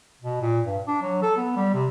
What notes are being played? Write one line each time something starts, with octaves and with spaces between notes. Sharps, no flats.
B2
A#2
G2
D4
F#3
A4
B3
G3
C3